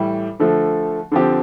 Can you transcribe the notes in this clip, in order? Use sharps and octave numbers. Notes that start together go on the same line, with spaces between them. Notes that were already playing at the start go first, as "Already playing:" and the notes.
Already playing: A2 E3 G3
D3 F3 A3
D3 F3 C4 G4